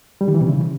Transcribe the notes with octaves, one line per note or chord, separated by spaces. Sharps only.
G3
D#3
E3
C3
C#3